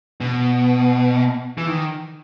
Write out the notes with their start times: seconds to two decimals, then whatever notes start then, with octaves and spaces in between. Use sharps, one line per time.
0.21 B2
1.58 E3
1.67 D#3